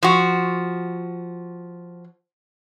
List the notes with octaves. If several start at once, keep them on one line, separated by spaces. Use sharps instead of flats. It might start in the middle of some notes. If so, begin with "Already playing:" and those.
F3 F#4